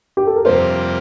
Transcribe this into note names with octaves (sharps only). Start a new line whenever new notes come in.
G4
A4
A#4
F2 C3 G3 A#3 F4 C5